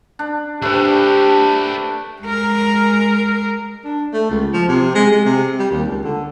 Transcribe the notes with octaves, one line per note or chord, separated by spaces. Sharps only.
D4
A3 D4 G4 B4 C5
G#3 A#4
D4
A3
C#2
F3
C3
G#3
G#3
C3
G3
D#2
C#2
D3